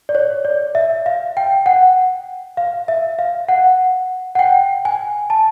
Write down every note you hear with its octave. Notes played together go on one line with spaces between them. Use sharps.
D5
C#5
D5
E5
F5
G5
F#5
F5
E5
F5
F#5
F#5
G5
G#5
A5